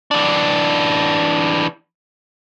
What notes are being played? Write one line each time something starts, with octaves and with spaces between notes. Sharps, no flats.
E3 D4